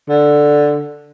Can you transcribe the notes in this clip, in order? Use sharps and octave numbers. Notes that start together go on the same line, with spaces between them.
D3